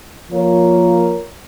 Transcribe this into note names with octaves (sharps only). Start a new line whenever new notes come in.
F3 A#3 F4 A#4 C#5